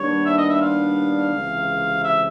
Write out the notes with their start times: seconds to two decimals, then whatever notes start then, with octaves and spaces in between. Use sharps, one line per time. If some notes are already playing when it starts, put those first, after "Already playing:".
Already playing: D#2 D#3 G3 B3 D4 C#5
0.26 E5
0.38 D#5
0.49 E5
0.61 F5
1.32 C#2 C3 E3
2.04 E5